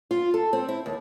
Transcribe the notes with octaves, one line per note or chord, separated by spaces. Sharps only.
F4
A4
C4
E4
D#2